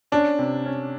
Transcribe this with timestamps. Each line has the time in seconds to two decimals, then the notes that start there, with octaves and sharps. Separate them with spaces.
0.12 C#4 D4
0.39 C3
0.66 C#4